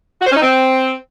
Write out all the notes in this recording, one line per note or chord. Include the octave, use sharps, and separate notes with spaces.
F#4
C5
C#4
D#4
C4